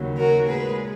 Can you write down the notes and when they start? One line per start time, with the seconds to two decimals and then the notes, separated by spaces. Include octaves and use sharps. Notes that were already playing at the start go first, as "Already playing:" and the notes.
Already playing: D#2 C#3 F#3
0.17 F#4 A#4
0.48 A#2 G#3 G#4 B4